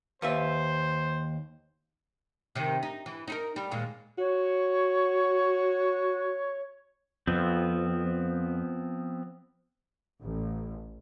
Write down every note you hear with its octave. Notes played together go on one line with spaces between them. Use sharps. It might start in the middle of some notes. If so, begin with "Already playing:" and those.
D#2 B4 C5 E5
C3 D#3
D#4
E3
D#4 E4 A#4
G3
D#2 A#2 G#3
F#4 C#5
F2 F3 B3 C4
A1